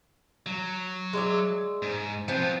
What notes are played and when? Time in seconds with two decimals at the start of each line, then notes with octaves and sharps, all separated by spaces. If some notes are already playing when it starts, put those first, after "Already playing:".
0.46 F#3
1.13 G#3 D5 E5
1.82 G#2
2.28 F3 B3 C4 F4